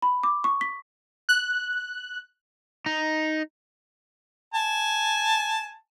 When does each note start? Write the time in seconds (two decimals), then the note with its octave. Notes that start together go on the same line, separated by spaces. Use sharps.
0.02 B5
0.23 D6
0.44 C#6
0.61 B6
1.29 F#6
2.86 D#4
4.54 G#5 A5